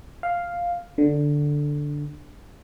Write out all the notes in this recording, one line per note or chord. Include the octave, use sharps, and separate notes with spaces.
F5
D3